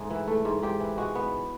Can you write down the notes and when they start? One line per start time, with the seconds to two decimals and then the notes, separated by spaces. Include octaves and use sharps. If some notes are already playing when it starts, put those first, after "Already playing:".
Already playing: G#2 A3 G#4
0.10 E3
0.27 A3
0.45 G#2
0.63 G#2 G4
0.80 E3
0.97 G#3 F#4
1.15 B3